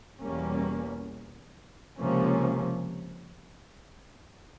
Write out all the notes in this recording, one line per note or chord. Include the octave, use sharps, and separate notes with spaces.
E2 B2 G3 A#3 C#4
C#2 C3 F3 A#3 C#4